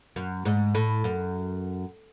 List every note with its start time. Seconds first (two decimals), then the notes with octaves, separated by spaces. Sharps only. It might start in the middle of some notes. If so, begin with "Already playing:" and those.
0.16 F#2
0.45 G#2
0.75 A2
1.04 F#2